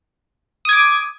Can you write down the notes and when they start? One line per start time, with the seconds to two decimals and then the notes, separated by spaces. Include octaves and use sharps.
0.65 D#6
0.69 G#6
0.73 D6